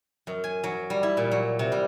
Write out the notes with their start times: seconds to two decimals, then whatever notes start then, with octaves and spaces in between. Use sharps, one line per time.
0.27 F#2
0.44 G#5
0.64 F#3
0.90 G3
1.03 E4
1.17 A#2
1.32 F#3
1.59 C3
1.72 G3